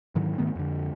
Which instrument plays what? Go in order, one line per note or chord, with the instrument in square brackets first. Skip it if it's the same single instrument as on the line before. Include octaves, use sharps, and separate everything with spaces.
[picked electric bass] G#2 D#3 E3 F#3
G#2 D#3 A3 B3
F2 D3